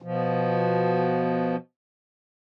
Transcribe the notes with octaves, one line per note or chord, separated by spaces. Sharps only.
B2 F3